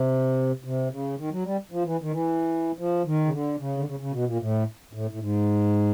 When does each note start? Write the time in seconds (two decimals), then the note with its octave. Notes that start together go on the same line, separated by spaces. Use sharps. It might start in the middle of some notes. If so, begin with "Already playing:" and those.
Already playing: C3
0.64 C3
0.91 C#3
1.18 D#3
1.32 F#3
1.45 G3
1.71 F3
1.85 E3
2.02 D#3
2.11 E3
2.78 F3
3.06 D#3
3.25 C#3
3.32 D3
3.59 C#3
3.77 D3
3.86 C#3
4.00 C#3
4.13 B2
4.26 A#2
4.40 A2
4.93 A2
5.11 A2
5.20 G#2